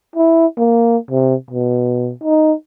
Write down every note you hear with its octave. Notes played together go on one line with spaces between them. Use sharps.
E4
A#3
C3
B2
D#4